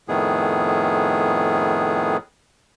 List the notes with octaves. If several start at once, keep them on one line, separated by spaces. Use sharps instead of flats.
F2 A2 D#3 B3 G#4